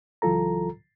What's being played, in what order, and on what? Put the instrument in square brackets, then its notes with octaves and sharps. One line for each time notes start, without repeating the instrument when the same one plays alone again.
[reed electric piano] C#2 E3 F#3 F4 A4 A#5